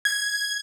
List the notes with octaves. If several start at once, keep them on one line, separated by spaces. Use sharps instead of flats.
G#6